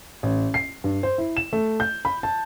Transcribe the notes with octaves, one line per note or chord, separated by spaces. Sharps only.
A1
C7
G2
C5
E4
E7
A3
G6
B5
A5